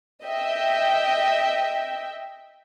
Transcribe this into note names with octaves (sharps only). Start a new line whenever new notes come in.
D#5 E5 G5